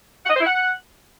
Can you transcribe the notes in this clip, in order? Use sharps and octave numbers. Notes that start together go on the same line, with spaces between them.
F#5
D#5
C5
E4
F#5